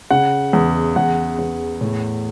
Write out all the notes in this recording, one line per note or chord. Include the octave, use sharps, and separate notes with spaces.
C#3 F#5
E2
E2 F#5
E2
A2